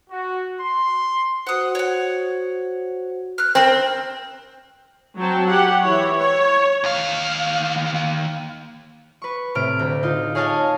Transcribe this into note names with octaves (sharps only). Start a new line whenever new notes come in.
F#4
C6
F#4 C5 F#5 D#6
C#5 F#5
F6 F#6
C4 A#4 C5 B5
F#3 C4 G5 A5
G4 F#5
E3 E4 C#5
C#5
D#2 F5
B4 C#6
A2 C3 F6 D7
D2
D#4 F4
G#4 C#5 D#5 F5 G#5 A5